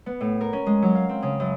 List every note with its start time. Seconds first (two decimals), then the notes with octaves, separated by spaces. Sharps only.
0.06 B3
0.21 A2
0.41 A#4
0.53 C#4
0.66 G#3
0.82 F#3
0.95 F5
1.09 C4
1.22 C#3
1.40 F#2